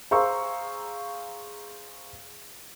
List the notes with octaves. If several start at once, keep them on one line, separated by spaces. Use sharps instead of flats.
G#4 C5 F5 A#5 C#6 E6